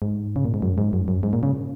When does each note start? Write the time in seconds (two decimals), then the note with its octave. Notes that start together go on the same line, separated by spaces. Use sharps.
0.02 G#2
0.36 C#3
0.45 A#2
0.54 G#2
0.62 F#2
0.78 G#2
0.93 F#2
1.08 F#2
1.23 G#2
1.33 A#2
1.43 C#3